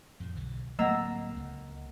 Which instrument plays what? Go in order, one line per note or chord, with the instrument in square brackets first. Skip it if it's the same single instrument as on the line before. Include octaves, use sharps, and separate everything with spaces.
[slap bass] F2 A2
B1 D3 E3
[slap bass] D1 F#3 C4 [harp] A#3 A#5 E6 [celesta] D#5 F#5
[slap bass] C#2